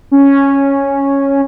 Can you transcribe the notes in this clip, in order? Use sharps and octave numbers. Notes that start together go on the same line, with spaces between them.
C#4